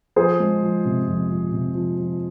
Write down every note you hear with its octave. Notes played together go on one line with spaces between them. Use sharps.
F3 G#4 C5
G#3
F3
C3
F2
F3
C3
F3
F3